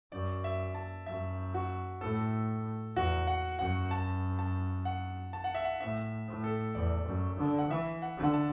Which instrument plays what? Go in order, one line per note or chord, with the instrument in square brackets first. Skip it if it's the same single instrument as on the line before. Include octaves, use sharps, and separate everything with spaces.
[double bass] F#2 [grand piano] D5
[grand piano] E5
A5
[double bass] F#2 [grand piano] E5
[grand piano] F#4
[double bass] A2 [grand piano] A4
[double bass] E2 [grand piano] F#4
[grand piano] F#5
[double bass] F#2 [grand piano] F#5
[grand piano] A5
A5
F#5
A5
F#5
E5
F#5
[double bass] A2 [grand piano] E5
[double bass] A2
[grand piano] A4
[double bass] E2 [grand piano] D5
[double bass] F#2
D3
[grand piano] F#5
[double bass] E3 [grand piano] E5
[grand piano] F#5
[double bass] D3
[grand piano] F#5
A5